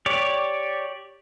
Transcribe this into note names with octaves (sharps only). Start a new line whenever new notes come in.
G4 C#5 D5